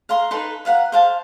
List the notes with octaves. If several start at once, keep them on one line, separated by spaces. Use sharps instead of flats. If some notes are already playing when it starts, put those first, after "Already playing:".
F5 A#5 C6
D#4 A4 B4 C6
B4 F5 F#5 A#5
C5 F5 A5